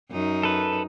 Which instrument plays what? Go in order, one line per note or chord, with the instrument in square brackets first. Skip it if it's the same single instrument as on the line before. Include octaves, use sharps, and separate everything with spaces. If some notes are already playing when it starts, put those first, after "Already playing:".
[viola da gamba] F#2 D#4
[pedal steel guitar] A4 B4